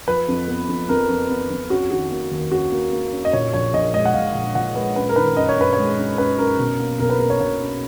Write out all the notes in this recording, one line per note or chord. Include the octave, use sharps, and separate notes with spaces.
F3 B4
F2
B3
F2
F2 A#4
F2
B3
F2
C#4 F#4
D#3 F#4
A#3
D#2
C#4 F#4
A#3
A#3
C#4
D#5
A#2 C#5
A#1 C#5
A#1 D#5
G#3 D#5
F#5
A#1 F5
A#1
A#2 F#5
G#3 B4
F#2 B4
A#4
D#3 B4
F#2 D#5
C#5
F#2 B4
C#5
G#3
F#2
F#2 B4
F#2 A#4
B2
A#3
B1 A#4
B4
A#3 A#4
C#5
B2 C#5
C#4